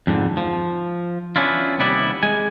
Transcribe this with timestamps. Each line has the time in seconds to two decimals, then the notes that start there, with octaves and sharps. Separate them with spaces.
0.07 F2 G#2 D3
0.37 F3
1.36 B3 C#4 D4 E4 F4
1.79 D#2 C3 G3 B3 E4 D5
2.23 G#3 G#5